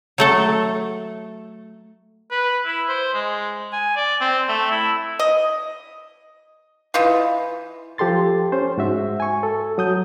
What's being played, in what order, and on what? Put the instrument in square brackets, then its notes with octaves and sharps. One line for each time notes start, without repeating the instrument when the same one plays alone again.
[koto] F#3 A3 A4
[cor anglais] B4
E4
C5
G#3
G#5
D5
C4
A3
E4
[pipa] D#5
E3 D#4 F4
[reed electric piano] F3 G4 A4 C6 A6
C#4 C5
G#2 F#4 E5
G#5 C#6
A4
F#3 D#6 G6